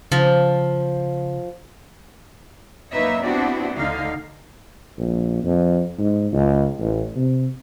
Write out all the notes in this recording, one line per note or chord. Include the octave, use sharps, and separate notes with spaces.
C#3 F3
F#2 A#3 D#4 B4 C#5 E5
B3 C4 D4 E4 F#4 G4
D2 D3 D#4 F5
A#1
F2
G#2
C#2
A1
C3